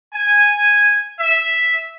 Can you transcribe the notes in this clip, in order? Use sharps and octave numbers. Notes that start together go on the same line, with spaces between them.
G#5
E5